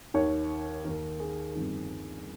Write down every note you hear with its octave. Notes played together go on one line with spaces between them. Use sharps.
D#2 D#3 C#5
D#2 D#3 A#4
G#4
G1 F2 D#3